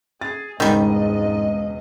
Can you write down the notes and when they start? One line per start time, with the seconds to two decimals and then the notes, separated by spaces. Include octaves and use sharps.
0.21 G#4 A6
0.60 E1 C#2 G#2 D#3 G3 C4 D#5